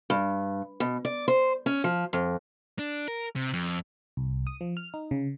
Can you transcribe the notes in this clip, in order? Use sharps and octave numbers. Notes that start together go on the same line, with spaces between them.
G2
B2
D5
C5
C#4
F3
F2
D4
A#4
C3
F2
C2
D#6
F3
F6
D#4
C#3